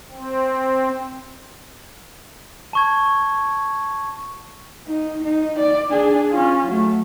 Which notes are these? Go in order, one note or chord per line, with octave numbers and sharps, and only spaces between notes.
C4
A5 C#6 G#6
D#4
D#4
D5
D4 G#4
C#4 F4
F#3 A3